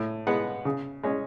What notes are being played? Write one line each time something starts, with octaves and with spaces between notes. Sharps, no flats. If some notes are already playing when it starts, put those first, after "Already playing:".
Already playing: A2
G#3 B3 F#5
C#3
G#3 C#4